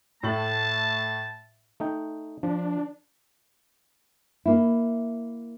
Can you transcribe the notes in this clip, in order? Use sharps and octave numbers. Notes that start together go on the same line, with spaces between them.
A2 A3 A5 F#7
A3 D#4 G5
F3 D4
A#3 E4